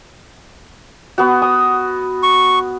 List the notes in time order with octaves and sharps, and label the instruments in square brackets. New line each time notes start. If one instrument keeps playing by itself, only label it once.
[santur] B3 F#4
D#6
[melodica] C#6